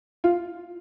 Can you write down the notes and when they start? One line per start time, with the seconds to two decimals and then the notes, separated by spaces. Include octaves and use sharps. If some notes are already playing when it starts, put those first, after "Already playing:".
0.24 F4